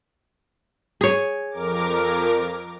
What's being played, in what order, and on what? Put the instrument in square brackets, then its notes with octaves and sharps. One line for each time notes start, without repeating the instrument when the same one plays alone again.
[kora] G#4 C#5
[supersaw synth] F2 A#4 D6